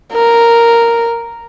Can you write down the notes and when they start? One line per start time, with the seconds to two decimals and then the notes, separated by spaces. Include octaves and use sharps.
0.13 A#4